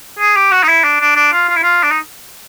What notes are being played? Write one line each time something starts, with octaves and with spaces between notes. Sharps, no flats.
G#4
G4
F#4
D#4
E4
D4
D4
D4
F4
F4
E4
F4
D4
D#4